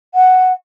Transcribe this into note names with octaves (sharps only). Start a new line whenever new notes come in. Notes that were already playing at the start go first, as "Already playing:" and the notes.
F#5